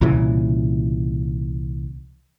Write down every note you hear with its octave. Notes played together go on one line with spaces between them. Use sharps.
C2 A#2 C#3 E3